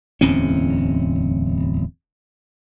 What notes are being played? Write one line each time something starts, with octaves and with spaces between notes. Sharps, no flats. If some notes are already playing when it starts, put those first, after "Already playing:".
D1 E2 C4 C#4